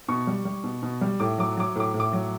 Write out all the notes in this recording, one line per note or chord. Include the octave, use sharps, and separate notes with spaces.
B2 C#6
G3
G3
B2
B2
G3
A2 D6
F#3 D6
F#3 D6
A2 D6
A2
D6
F#3